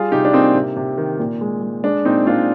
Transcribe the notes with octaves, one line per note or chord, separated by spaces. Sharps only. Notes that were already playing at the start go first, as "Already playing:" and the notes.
Already playing: G3 F4 G#4
C3 D#4 G4
D4
A#3 C4 D#4
C3
C3
D#3
A#2
G#3
G#3
G#3 D4
A#2 C4 D#4
A#2 D4 F4